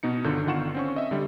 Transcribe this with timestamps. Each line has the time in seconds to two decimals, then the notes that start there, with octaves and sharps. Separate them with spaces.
0.03 B2 B3 D#4 C#7
0.24 G1 D3 D#3 F4 G6
0.46 D3 D#3 F4 F#5 C#6 E7
0.75 C4 C#4 C#6
0.96 D#5 E5
1.11 D3 G3